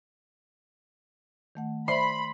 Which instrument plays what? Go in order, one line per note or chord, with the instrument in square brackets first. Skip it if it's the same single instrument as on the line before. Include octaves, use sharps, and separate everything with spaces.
[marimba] D#3 A3 F#5
[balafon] C5 D5 E5 [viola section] B5 [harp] C6